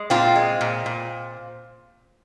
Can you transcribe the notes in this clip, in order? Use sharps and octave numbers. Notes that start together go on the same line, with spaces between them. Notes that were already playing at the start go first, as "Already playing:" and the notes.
Already playing: G#3
A#2 C4 F4
G#3
A#2
A#2